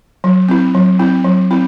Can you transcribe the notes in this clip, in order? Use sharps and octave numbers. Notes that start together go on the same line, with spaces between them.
F#3
C4 E4
F#3
C4 E4
F#3
C4 E4